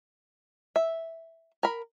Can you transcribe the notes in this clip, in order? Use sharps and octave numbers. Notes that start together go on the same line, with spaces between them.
E5
A#4 B5